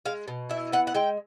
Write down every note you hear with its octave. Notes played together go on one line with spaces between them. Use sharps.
G#3 F5
B2
E4 E5
B3 F#5
F#5
G#3 G5